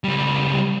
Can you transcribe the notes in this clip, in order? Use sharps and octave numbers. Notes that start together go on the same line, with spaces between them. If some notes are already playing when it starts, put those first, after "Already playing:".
C#2 G3